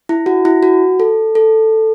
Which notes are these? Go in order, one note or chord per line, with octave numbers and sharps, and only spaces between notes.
E4
F#4
E4
F#4
A4
A4